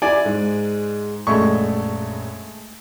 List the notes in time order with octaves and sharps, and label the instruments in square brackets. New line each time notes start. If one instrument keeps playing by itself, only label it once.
[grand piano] E4 [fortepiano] D5 G#5
[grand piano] G#2 G#3
[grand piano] A#1 F#2 G#6 [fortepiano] G#3 A3 C#6